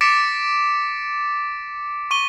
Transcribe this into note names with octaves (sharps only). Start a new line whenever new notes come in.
D6 A6 B6 C#7 D7 E7
C#6 D#7 G7